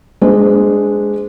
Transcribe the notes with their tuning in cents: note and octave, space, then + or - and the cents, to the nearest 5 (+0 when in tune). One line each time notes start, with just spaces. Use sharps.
G#3 +0 D4 +0 C5 -30